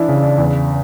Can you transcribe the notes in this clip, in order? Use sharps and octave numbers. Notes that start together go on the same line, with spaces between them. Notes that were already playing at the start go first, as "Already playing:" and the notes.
Already playing: E3 D4 E4
C#3
D4
E2